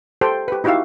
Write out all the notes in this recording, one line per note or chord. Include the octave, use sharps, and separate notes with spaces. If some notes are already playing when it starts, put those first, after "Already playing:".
G4 A4 C5 G5
G4 B4
D#4 E4 F#4 G4 E5 F5